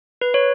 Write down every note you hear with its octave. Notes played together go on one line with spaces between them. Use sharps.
B4
C#5